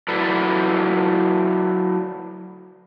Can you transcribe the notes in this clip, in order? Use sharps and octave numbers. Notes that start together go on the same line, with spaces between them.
F#3 E4 A4 B4 D5